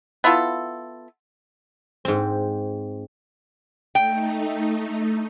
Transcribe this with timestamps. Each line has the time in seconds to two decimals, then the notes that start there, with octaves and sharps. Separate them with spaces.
0.24 B3 E4 F4 A4
2.05 G#2 C4
3.95 A3 D#4 G5